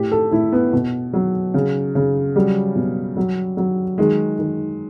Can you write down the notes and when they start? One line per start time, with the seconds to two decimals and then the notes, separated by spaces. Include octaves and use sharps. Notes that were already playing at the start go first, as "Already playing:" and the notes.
Already playing: A2 G4
0.12 A4
0.31 A2 E4
0.52 B3
0.73 B2
1.13 F#3
1.54 C#3
1.95 C#3
2.36 F#3 G3
2.76 B2
3.17 F#3
3.57 F#3
3.98 D#3 G#3
4.39 D#3